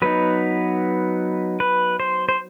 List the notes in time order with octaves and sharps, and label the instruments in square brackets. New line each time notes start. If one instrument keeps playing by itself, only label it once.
[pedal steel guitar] F#3 B3 D#4 B4
B4
C5
C5